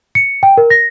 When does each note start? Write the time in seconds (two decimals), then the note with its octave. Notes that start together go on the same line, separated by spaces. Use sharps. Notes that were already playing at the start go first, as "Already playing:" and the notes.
0.15 C#7
0.43 G5
0.58 A#4
0.70 A#6